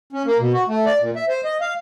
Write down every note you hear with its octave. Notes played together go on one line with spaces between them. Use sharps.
C#4
A#3
B2
F#4
A3
D5
A#2
E5
C5
D#5
F5